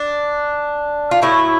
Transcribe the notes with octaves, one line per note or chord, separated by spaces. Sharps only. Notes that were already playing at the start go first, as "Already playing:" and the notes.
Already playing: D4
F4
A2 F#3 A3 E4